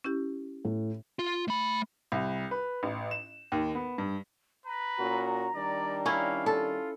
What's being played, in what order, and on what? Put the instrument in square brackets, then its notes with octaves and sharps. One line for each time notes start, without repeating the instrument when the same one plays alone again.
[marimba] C#4 E4 G4
[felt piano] A2
[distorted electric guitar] F4
A3 B5
[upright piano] C2
B4
A1
E7
D#2
B3
G2
[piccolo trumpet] B4 [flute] A#5
[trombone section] A#2 C#4 F#4
[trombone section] D#3 G3 D4 [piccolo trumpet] D5
[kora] C#4 E4 [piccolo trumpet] F5
[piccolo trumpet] F4 [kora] A4